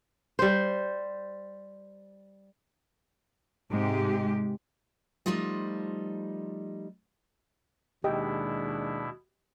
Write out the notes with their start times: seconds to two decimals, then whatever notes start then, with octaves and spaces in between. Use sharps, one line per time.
0.39 G3 C5
3.71 G#2 C3 G#3 G4
5.26 F3 G3 A3 D#4 F4 D#5
8.04 D#2 B2 G#3 D4 E4 G4 D#5 G5